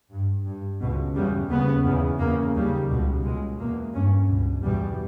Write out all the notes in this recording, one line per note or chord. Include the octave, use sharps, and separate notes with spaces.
G2
G2
C#2 B2
E2 C#3 G3
D#2 C#3 B3
E2 C#3
E2 C#3 A#3
D#2 C#3 G3
C#2 B2
C#2 B2 G#3
E2 B2 A#3
G2 C#4
C#2 B2
E2 B2 G3